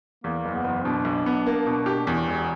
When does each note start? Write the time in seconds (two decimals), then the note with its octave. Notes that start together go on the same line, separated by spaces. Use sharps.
0.24 E2 A#3
0.45 F#1
0.54 B3
0.64 F#1
0.85 B2 D4
1.05 B1
1.26 B3
1.47 A#3
1.66 B2
1.86 G4
2.07 E2 C#4
2.28 E1